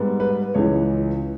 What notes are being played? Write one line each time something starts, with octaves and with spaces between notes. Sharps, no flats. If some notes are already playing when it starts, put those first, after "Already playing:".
Already playing: G#2 G3 B3
B4
C#2 C#3 E3 C#5